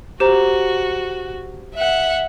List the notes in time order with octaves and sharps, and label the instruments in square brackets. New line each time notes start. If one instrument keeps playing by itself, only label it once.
[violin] F#4 [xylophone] G4 C5 A#5
[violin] E5 F#5